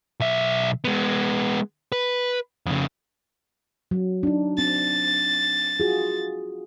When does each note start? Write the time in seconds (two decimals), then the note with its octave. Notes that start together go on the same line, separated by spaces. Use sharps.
0.20 B1 E5
0.84 G#3 B3
1.92 B4
2.66 F2 C#3
3.91 F#3
4.23 D4 D#4
4.58 C4 A6
5.80 F4 F#4 G#4